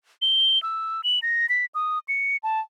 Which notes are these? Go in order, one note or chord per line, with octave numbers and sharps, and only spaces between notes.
G7
E6
F#7
A#6
B6
D#6
C#7
A5